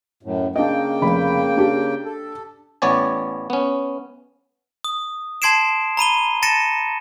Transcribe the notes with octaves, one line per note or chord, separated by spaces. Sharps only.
F#2 A2
C#3 A#3 D4 D#5 G5
F1 B5
D4 G4
A4
A1 B3 C#5 D5 G#5
B3 C#4
D#6
A5 C6 G#6 C7 D7 E7
A#5 B5 D#7 G7
A5 A6 A#6 C#7 D#7 E7